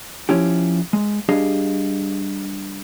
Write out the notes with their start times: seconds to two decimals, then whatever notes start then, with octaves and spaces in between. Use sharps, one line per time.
0.29 F3 C#4 E4 G4
0.93 G#3
1.29 G3 D4 G4 G#4 D#5 F5